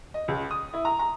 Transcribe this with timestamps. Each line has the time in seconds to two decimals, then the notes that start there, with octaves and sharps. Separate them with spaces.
0.14 D#5
0.28 C#2
0.51 D#6
0.74 E4
0.85 A#5
0.99 A#5